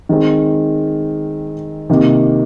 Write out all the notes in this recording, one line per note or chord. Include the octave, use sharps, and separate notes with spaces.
D#3 G#3 C4
C3 D#3 A#3